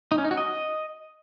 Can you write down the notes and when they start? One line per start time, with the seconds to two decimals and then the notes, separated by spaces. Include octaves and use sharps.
0.12 D#4
0.18 C#4
0.24 D#4
0.31 F#4
0.37 D#5